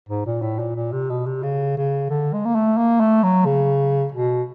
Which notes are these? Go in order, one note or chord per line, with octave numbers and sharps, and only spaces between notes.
G#2
A#2
A2
A#2
A#2
C3
B2
C3
C#3
C#3
D3
G#3
A#3
A3
A#3
A3
F#3
C#3
B2